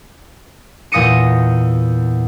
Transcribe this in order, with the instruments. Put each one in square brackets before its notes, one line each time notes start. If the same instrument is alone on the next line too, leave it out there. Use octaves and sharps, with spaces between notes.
[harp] E2 A#2 D#6 A#6 C#7 D#7